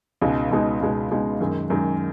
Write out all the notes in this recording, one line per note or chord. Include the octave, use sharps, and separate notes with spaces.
C#2 B2 G#3 D#4
C#2 B2 G#3 D#4
C#2 B2 G#3 D#4
C#2 B2 G#3 D#4
F#2 D#3 G#3
F#2 D#3 G#3